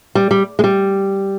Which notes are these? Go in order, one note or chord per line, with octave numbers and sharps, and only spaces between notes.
G3
G3
G#3
G3